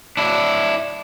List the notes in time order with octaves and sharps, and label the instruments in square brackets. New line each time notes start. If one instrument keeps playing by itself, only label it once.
[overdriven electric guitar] D4 E4